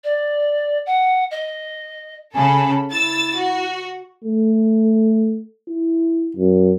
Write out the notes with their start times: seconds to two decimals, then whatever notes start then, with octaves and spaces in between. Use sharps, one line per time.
0.04 D5
0.86 F#5
1.31 D#5
2.35 C#3 A4 G#5 B5
2.92 E4 E6 A6
3.36 F#4
4.24 A3
5.69 E4
6.37 F#2